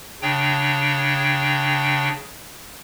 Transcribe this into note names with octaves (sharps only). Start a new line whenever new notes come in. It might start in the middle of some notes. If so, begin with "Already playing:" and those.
C#3 D4 C#5 G5